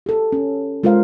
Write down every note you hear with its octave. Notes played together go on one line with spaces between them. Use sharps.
G4 A4
C#4
G#3 F4 A#4 C5 F5